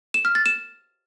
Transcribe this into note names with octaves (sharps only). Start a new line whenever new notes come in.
E7
F6
A6
E7